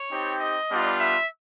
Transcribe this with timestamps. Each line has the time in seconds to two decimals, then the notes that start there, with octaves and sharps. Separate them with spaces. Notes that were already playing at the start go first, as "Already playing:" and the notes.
Already playing: C#5
0.11 C4 D#4 G4
0.39 D#5
0.69 G3 B3 D4 F4
0.99 E5